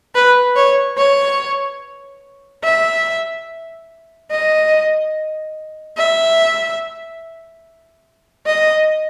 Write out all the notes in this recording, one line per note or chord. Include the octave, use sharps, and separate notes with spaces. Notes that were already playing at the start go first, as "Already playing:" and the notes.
B4
C#5
C#5
E5
D#5
E5
D#5